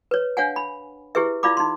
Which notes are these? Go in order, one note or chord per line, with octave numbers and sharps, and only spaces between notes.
B4 C#5
D4 C#5 F5 F#5 G#5
B5
E4 G4 G#4 B4 E5
E4 F4 D5 F5 B5 D6
D#4 C6